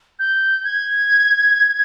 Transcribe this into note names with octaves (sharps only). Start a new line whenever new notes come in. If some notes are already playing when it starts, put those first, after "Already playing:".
G6
G#6